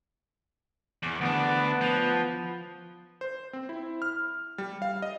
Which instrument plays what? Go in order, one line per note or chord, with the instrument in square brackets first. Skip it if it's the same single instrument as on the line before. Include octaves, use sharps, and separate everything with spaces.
[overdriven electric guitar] E2
[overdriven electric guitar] D2 D4 [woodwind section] B3
[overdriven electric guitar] F3
[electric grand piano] C5
C4
E4
F6
G3
F5
D#5